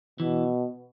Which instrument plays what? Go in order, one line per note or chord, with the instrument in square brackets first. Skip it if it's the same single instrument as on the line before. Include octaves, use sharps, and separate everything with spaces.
[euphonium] B2 [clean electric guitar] E3